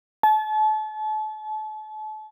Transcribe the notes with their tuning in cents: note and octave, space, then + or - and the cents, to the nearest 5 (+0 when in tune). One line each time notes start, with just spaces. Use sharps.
A5 -35